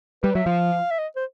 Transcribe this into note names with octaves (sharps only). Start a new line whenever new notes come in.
G3 B4
F#3 E5
F3 F5
E5
D#5
C5